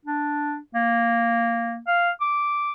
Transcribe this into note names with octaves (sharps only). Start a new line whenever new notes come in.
D4
A#3
F5
D6